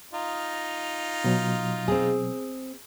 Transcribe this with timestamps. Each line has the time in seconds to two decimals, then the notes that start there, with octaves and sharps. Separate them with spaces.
0.13 D#4 F4
1.24 B2 F#3
1.88 C4 G#4